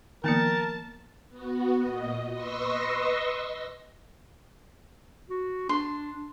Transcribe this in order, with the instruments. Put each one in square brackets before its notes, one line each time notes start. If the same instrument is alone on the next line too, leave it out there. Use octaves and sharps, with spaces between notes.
[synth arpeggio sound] D#3 C#7 [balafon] F3 A#3 B3 [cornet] A#4 [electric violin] A5
[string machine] B3 F#4
A#2 D#5
B4 D#5 C6 C#6 E6 A#6
[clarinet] F#4
[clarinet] D4 [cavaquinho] C6